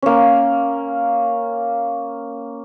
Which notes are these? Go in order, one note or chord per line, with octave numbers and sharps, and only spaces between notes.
A#3 C#4